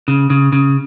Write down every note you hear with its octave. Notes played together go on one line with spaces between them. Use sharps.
C#3
C#3
C#3